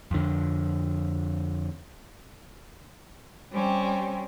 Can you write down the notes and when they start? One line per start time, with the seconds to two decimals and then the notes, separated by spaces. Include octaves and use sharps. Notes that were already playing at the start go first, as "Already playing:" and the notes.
0.11 F2 D3
3.52 G3 C4 C#4